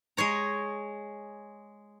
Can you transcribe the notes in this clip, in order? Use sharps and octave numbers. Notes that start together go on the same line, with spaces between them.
G#3 G#4 C#5 A#5